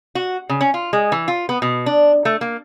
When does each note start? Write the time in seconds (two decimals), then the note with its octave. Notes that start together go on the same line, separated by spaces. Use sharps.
0.15 F#4
0.49 C#3
0.61 C#4
0.74 F4
0.93 G#3
1.12 E3
1.28 F4
1.49 B3
1.62 B2
1.86 D4
2.25 A3
2.41 A#3